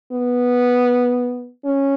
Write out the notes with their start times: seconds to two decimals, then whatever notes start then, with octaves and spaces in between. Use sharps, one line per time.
0.12 B3
1.65 C#4